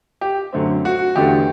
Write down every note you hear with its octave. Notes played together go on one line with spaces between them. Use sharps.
G4
F#2 D3 A3 C4
F#4
E2 D3 A3 D4 G4